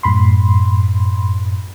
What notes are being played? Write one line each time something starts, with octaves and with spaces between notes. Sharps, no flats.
F#2 A2 B5 C6